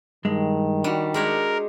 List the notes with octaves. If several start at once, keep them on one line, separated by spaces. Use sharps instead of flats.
G2 D#3 G#3
G3 D4 F#4
G#3 G4 A#4 C#5